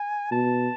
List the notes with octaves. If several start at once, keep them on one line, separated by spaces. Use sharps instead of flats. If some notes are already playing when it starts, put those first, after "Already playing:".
Already playing: G#5
B2 A5